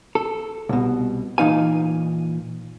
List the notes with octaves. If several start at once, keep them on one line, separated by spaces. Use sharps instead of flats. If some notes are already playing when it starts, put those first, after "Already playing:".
A4
C2 B2
A#2 E3 D#4 F5 G#5